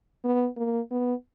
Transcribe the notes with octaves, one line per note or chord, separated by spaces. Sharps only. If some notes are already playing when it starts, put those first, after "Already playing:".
B3
A#3
B3